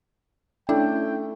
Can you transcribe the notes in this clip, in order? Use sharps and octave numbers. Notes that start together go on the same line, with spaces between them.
A3 C#4 D4 E4 G5